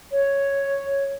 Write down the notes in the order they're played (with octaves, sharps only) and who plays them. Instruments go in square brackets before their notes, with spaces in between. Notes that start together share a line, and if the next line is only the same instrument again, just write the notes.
[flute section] C#5